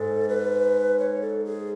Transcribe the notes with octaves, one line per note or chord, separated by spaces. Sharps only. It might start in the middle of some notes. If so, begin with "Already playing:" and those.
Already playing: G#2 A4
B4
C#5
A4
G#4